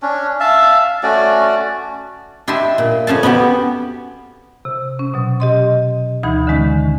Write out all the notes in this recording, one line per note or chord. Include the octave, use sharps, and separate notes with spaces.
C#4 D4
E5 F5 A5
A3 C#4 F#4 D5
D4 E4 G4 D#5 E5 C6
A#2
F2 C#4 F5 A5
B3 C#4 F#4 G4
C3
C#4
B2 F#3
G4 D#5 C6
D2 E3 D#4 B5 G#6
D3 D#3 G#3 C#4